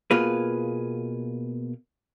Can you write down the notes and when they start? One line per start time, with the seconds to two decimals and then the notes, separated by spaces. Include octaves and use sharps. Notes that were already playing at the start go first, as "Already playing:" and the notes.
0.11 B2 A#3 F4 G#4 B4